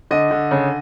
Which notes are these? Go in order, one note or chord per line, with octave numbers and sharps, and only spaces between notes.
D3 D#5
D3
C#3